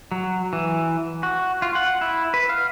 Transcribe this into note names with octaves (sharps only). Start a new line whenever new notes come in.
F#3
E3
F#4
F4
F#5
E4
B4
F5